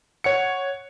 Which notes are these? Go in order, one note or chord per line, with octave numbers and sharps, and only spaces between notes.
C#5 F#5 C#7